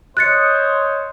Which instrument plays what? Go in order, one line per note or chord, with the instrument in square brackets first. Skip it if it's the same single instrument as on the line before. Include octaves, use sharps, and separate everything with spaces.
[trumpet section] C5 C#5 D#5 [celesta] F#6 A6 C#7